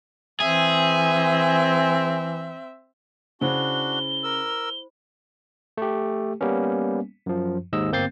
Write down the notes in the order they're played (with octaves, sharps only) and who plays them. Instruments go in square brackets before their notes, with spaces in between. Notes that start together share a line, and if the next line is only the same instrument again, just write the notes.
[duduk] E3 [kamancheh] C4 E5 [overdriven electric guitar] G#4
[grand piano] C#3 F#5 [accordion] D4 F#4 [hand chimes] E4 C5 B5 [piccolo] G7
[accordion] A#4 E6
[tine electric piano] A3 G4
G3 A#3 B3 C#4
F#2 F3
D#2 G#2 D#5 E6
G1 A#3 C4 G6 A6 C7